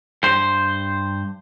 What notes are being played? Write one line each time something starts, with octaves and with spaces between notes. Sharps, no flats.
G2 C5